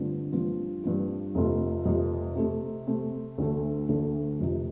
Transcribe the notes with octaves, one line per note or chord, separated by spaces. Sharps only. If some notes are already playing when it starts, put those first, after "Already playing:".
Already playing: G2 D3 A3 C4 F4
G2 F3 C4 F4
G2 F3 C4 F4
F1 F2 C3 A3 F4
F1 F2 C3 A3 F4
C3 A3 C4
C3 A3 C4
D2 D3 A3
D2 D3 A3
F1 F2 C3